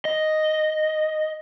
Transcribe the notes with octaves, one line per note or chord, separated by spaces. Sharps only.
D#5